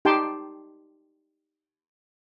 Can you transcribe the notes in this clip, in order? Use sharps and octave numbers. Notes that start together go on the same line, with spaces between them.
D#4 G4 G5 A5 C6